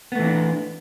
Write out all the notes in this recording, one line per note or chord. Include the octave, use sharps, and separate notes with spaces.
E3 A3 B3 C4 D4